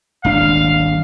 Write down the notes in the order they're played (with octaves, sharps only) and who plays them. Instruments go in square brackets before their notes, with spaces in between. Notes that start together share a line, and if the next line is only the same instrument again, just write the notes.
[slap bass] D#1 G#1 D4 [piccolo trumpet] F5